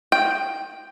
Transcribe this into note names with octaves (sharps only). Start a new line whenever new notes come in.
G5